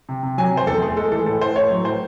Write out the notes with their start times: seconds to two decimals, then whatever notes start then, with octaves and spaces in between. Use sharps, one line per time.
0.09 C3
0.23 C3
0.38 F#3 G#5
0.52 C3
0.57 C5
0.67 E2 A4
0.82 A3 G#4
0.96 G#3 A4
1.12 E3 A4
1.26 A2 A4
1.41 A2 C5
1.55 A3 C#5
1.71 F#3
1.85 A2 C5